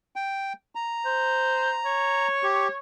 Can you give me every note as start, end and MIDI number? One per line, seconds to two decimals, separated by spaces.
0.16 0.53 79
0.75 2.28 82
1.06 1.77 72
1.85 2.79 73
2.43 2.68 67